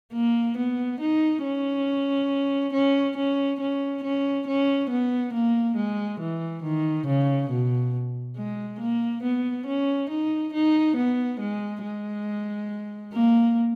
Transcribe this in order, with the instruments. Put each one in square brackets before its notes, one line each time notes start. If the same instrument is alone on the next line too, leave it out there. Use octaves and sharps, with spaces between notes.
[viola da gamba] A#3
B3
D#4
C#4
C#4
C#4
C#4
C#4
C#4
B3
A#3
G#3
E3
D#3
C#3
B2
G#3
A#3
B3
C#4
D#4
D#4
B3
G#3
G#3
A#3